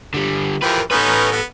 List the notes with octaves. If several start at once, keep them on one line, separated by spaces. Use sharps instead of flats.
D3 G3
E3 F3 G4 A#4 B4
B3 C#4 D#4 A4 B4
B3